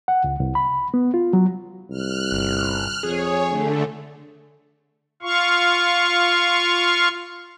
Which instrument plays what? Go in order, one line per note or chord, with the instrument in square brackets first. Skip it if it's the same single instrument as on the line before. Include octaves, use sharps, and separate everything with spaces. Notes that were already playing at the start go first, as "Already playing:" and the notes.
[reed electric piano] F#5
C#2
C2
B5
B3
F4
F#3
[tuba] C2 [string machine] F6 F#6
[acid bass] G1
[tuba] F2 [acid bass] G#4 [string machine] C#5
[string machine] D3 A3
[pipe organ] F4 F5 C#6